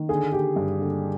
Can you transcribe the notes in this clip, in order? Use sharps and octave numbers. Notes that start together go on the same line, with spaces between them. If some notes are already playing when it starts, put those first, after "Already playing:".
Already playing: D#3
D3 G#4
D3 G4
G2
D3